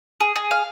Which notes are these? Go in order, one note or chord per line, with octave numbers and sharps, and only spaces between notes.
G#4
G#4
F5